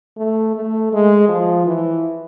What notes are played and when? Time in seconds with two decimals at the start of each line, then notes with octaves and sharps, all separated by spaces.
0.17 A3
0.56 A3
0.93 G#3
1.29 F3
1.66 E3